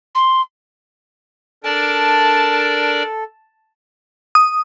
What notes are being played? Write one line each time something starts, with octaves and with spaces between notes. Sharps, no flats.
C6
D4 A4 A#4 D5 A5
D#6